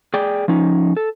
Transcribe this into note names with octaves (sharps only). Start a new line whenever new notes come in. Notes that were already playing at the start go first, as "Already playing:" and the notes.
G#4 D5 G5
F3 C#4 D#4
A4